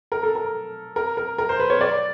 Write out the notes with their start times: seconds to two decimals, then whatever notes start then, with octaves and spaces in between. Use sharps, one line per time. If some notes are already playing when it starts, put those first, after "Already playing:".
0.12 A#4
0.23 A4
0.35 A#4
0.96 A#4
1.17 A#4
1.38 A#4
1.49 C5
1.60 B4
1.70 C#5
1.81 D5